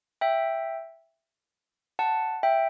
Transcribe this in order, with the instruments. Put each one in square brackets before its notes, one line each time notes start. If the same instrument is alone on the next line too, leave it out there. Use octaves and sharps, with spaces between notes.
[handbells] E5 G5
F#5 A5
E5 G5